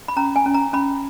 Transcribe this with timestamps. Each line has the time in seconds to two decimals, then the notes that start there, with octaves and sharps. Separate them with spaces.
0.08 B5
0.16 C#4 A#5
0.36 G#5
0.46 C#4
0.54 A#5
0.73 C#4 B5